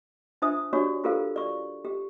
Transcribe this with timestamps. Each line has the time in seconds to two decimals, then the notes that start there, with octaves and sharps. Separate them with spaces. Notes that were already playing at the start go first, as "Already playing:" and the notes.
0.42 D4 F4 C5 E5 A5 D#6
0.73 D4 F#4 G4 C#5 D5 C#6
1.04 F4 G4 A4 A#4 C5 F5
1.36 D5 C#6
1.85 G4